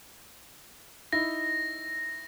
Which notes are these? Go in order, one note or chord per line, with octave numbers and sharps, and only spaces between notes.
D#4 E4 A#6